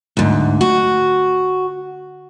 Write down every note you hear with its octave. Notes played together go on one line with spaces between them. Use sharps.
D2 G#2
F#4